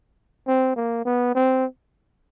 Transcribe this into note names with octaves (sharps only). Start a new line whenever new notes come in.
C4
A#3
B3
C4